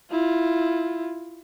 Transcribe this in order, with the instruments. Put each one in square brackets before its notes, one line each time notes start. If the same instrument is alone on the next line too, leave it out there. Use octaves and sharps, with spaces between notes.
[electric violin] E4 F4